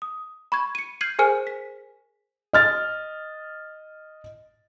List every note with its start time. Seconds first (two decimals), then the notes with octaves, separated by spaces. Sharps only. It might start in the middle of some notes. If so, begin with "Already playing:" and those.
0.02 D#6
0.52 B5 C#6 G#6
0.75 C#7 D#7
1.01 F6 G6 G#6 C7 D#7 F#7
1.19 G#4 A#4 C5 G#5 F6 D#7
1.47 B6
2.53 D#5 F6 A6